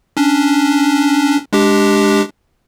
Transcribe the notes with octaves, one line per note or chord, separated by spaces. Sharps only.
C#4 D4
G#3 D4 G4